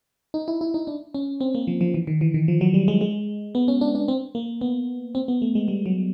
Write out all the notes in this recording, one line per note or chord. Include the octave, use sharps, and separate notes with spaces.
D#4
E4
E4
D#4
D4
C#4
C4
A#3
F3
F3
E3
D#3
E3
D#3
F3
F#3
G3
G#3
G#3
B3
C#4
D4
D4
C4
A#3
B3
C4
B3
A3
G#3
G3
F#3